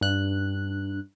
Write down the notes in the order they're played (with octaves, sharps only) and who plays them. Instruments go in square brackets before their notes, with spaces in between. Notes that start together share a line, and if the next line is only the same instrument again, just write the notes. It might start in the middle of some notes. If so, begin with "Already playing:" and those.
[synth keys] G2 F#6